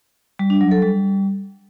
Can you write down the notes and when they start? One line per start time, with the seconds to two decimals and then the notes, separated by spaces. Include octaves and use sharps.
0.39 G3
0.50 D4
0.61 F#3
0.71 A4
0.82 G3